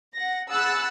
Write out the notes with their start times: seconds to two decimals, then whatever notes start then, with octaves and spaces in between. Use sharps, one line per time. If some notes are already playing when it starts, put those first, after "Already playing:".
0.14 F#5 A#6
0.50 G#4 F#5 B5 E6 F#6 A6